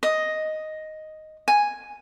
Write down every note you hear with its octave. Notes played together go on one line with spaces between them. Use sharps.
D#5
G#5